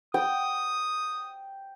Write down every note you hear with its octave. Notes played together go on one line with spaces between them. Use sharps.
G5 D#6